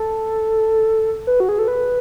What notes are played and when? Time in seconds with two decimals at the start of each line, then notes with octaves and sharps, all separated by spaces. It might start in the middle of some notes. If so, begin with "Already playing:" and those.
Already playing: A4
1.27 B4
1.40 F#4
1.49 G#4
1.59 A4
1.68 B4